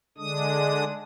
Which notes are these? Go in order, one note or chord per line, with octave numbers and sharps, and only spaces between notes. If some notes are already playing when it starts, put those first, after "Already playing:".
D3 G#3 D4 D#6